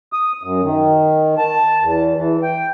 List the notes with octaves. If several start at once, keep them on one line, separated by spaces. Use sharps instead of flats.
D#6
F#2
D#3
A5
E2
E3
G5